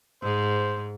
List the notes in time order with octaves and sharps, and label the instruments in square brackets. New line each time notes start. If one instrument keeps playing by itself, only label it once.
[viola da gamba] G#2 [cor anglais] C5